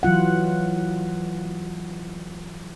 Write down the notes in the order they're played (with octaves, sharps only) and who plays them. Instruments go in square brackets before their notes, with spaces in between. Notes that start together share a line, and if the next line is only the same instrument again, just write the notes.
[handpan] E3 F#3 F4 F#5